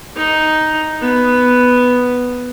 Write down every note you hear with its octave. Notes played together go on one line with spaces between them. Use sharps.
D#4
B3